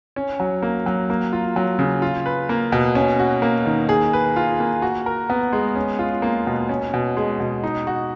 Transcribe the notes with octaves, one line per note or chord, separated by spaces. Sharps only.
C#4
F#3
A#3
F#3
A#3
F4
F#3
C#3
F4
B4
A#3
B2
C#4
F#4
A#3
D#3
G#4
B4
F4
A#3
F#4
A#4
B3
G#3
C#4
F4
A#3
B2
C#4
B2
G#3
B2
D#4
F#4